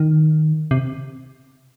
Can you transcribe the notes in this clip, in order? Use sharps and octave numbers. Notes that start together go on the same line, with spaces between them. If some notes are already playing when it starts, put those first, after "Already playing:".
Already playing: D#3
C3